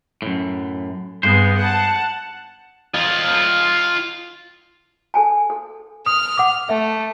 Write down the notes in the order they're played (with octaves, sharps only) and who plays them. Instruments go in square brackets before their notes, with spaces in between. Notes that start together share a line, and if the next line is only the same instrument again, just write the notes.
[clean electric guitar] F#2 A2
[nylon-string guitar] G2 [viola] G#3 B3 [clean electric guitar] C5
[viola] F#5 A5
[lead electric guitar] F4 D#5
[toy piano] A4 G#5 A5
A4
[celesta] D#6 [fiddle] F6
[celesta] F#5 D6
[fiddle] A3 [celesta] E5